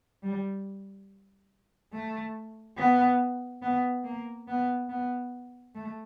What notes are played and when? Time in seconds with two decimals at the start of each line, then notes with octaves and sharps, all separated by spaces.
0.23 G3
1.93 A3
2.78 B3
3.62 B3
4.04 A#3
4.48 B3
4.89 B3
5.75 A3